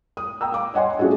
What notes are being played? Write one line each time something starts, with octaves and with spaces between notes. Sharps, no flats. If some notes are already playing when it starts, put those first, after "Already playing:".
D#6
G5 A#5 E6
F5 D6
C#5 D#5 F#5 G#5 C6
A3 C#4 F#4 G#4 A4